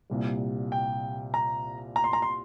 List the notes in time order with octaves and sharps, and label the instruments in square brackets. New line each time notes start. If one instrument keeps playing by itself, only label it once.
[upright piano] C2 A#2 G3
[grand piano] G5
A#5
A#5
C6
A#5
C6